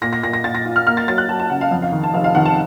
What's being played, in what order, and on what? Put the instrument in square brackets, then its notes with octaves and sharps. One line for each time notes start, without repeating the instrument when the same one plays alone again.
[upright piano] A#2 A#6
A#6
A#2 A#6
A#6
A#2 A6
A#6
F4
F6
A#3 F6
A6
F#3 A6
F#6
F#3 A5
A5
C#3 F#5
F5
F2
F5
D#3
A5
F1 F5
F5
D#3 F#5
A5